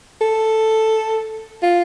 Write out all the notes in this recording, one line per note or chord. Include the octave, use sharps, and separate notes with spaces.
A4
F4